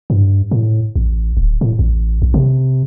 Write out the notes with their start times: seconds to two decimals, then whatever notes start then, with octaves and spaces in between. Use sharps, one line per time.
0.10 G2
0.51 A2
0.96 A1
1.37 D1
1.61 A2
1.79 A1
2.22 A#1
2.34 C3